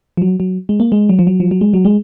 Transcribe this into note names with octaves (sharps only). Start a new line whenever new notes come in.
F3
F#3
F#3
G#3
A#3
G#3
F#3
F3
F#3
F3
F#3
G#3
F#3
G#3